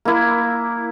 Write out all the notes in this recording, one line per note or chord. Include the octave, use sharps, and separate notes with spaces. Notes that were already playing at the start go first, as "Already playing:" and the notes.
A#3 E4